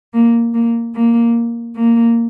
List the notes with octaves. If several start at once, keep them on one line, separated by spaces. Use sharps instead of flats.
A#3
A#3
A#3
A#3